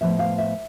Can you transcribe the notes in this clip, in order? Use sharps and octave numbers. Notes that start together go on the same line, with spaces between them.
A2 F3 G#3 B3 E5
F5
E5